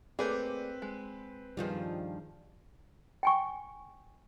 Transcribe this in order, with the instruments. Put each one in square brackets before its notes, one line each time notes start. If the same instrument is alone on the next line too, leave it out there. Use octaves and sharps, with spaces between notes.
[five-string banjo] A3 A#3 G#4 [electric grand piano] C4 B4 G6 [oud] D5
[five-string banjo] G#3
[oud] G2 D#3 F3 [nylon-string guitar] G3 F4 G#4
[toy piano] G5 G#5 C#6